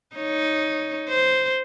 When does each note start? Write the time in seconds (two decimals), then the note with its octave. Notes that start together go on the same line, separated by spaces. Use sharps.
0.16 D#4 C#5
1.09 C5